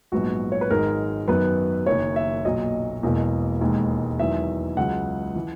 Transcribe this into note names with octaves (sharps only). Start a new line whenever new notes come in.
A#1 G#2 F#3 B3 F#4
C#5
B4
G#1 G#2 D#3 G#3 A#4
F#2 D#3 F#3 B3 B4
F#1 F#2 D#3 C#5
E5
B1 A#2 F#3 D#5
E1 E2 B2 A#3
E1 D#2 D#3 G#3
E2 D#3 F#3 E5
C#2 C#3 F#3 F#5
E3